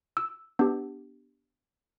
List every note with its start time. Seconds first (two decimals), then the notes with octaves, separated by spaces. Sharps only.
0.17 E6
0.59 B3 D4 G4